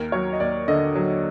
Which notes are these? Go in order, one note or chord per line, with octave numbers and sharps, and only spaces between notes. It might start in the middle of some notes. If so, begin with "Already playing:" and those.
Already playing: D#2 A#4
F#3 C#5
D#5
D#2 D5
D3 D#5
F#3